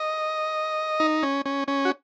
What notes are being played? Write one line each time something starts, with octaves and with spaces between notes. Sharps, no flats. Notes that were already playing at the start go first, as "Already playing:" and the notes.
Already playing: D#5
D#4
C#4
C#4
C#4
F#4